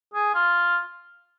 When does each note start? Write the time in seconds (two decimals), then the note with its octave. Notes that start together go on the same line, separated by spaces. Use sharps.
0.13 G#4
0.34 F4